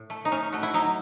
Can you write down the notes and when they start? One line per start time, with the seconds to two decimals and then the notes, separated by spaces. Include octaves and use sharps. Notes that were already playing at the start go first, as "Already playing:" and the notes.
Already playing: A2
0.10 A3
0.25 D#4
0.32 A2 C#4
0.53 A3 F#4
0.63 E4
0.74 F#3 D#4